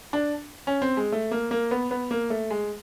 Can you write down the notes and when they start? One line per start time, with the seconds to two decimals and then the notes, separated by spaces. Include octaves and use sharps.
0.13 D4
0.67 C#4
0.82 C4
0.97 G#3
1.12 A3
1.31 A#3
1.51 A#3
1.71 B3
1.91 B3
2.11 A#3
2.30 A3
2.51 G#3